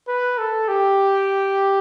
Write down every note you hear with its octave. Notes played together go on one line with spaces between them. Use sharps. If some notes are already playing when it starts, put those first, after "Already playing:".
B4
A4
G4